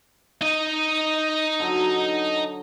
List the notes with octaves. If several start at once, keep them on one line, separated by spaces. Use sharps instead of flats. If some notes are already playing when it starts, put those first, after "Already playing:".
D#4 D#5
D3 F#3